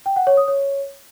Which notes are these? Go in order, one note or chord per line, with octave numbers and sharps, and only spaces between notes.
G5
F#5
C#5
D#6
C#5